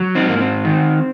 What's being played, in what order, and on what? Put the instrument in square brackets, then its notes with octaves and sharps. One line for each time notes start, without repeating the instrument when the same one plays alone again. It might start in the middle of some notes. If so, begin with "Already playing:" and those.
Already playing: [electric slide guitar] F#3
C4 D#4
G#2 A#3
C4
D#3